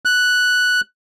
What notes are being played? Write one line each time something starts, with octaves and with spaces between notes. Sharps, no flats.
F#6